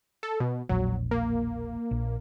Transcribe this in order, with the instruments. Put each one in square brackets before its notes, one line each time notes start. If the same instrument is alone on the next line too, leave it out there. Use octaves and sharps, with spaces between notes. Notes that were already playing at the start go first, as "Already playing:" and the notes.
[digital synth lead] A4
B2
[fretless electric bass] E1 A#1 [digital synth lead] F#3
[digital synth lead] A#3
[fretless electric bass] A#1